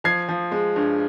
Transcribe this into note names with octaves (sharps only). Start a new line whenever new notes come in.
F3 G#6 C7
F3
G#3
G2